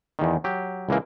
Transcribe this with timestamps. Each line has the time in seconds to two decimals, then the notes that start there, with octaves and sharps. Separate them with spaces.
0.19 E2 D#3
0.44 F#3 G4
0.89 C#2 E3 A#3